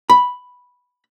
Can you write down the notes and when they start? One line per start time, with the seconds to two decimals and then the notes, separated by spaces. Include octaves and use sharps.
0.10 B5